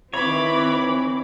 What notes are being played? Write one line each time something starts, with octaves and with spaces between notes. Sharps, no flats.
D#3 E3 C4 C#5 B5 D6